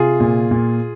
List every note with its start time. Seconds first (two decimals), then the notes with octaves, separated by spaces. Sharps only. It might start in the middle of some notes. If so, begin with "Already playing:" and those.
Already playing: C3 F4 G#4
0.20 A#2
0.51 A#2